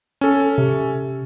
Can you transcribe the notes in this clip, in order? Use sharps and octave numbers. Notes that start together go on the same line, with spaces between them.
C#4 A4
C3